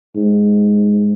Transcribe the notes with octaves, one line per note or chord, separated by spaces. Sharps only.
G#2